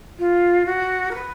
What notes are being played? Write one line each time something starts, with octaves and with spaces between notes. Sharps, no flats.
F4
F#4
A#4
B4